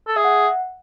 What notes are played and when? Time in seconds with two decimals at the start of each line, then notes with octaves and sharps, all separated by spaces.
0.07 A4
0.16 G#4 E5
0.24 F#5